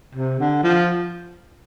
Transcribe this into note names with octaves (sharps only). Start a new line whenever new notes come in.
C3
D3
F3